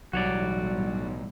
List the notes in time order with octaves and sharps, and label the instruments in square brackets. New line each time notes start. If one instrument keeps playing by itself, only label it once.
[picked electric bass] B1 F#3 [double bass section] A2 E3 G3 [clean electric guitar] F#4 C#5 D5